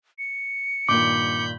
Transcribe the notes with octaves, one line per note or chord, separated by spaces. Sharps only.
C#7
G2 A#2 D#3 B5 D6 G6